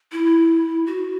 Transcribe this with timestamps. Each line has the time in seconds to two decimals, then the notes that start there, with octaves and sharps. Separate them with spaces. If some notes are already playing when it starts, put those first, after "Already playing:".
0.12 E4
0.87 F#4